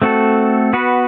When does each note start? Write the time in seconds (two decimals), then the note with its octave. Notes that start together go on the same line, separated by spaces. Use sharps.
0.02 A3 C4 F#4 A4
0.73 B3 F#4 B4